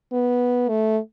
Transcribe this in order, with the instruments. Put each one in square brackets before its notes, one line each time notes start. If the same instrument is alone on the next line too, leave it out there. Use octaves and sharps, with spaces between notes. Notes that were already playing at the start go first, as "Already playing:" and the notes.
[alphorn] B3
A3